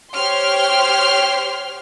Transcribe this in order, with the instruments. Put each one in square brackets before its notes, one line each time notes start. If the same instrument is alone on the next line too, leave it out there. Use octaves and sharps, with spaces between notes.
[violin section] G4 C5 C#5 G5 C6 F6